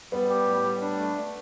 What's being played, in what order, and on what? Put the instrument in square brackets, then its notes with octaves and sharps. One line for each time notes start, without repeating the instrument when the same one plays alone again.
[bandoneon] G3 [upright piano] B3
[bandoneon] G4
A2
G3
D4
A3
A3